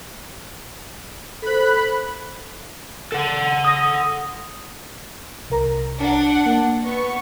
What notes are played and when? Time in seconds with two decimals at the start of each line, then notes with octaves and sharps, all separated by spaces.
1.42 A4 C5 B5 F#6
3.12 A4 F#5
3.65 D#6 A#6
5.50 C2 A#4 A#5
5.99 D4 F#5
6.46 A#3
6.83 B3 C#6